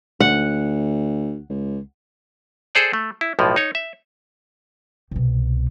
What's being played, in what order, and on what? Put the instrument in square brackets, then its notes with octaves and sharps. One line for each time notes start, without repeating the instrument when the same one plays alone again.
[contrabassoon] D2 [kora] F#5
[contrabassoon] C#2
[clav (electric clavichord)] G#4 A4 C5 D5 G5
A3
E4
B1 A2 F3
D#4 C#5
E5
[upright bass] C2 B2